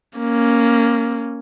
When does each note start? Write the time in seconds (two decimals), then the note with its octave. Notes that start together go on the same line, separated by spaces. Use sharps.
0.19 A#3 C#4